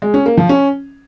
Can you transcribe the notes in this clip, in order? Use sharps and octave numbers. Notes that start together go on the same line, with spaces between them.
G#3
C#4
A#3
F3
C#4